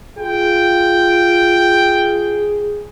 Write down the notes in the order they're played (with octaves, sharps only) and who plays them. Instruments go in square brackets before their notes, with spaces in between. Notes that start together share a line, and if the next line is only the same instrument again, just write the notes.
[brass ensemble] F4 [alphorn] G#4 [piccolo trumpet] G5